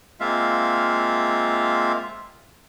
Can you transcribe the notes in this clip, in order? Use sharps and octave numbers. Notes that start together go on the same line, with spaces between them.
G#3 A#3 C4 F4 E5 F5